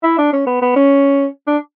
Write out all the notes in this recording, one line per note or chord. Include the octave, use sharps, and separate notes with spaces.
E4
D4
C#4
B3
B3
C#4
D4